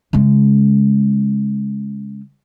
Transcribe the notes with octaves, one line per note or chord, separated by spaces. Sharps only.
C#3 G#3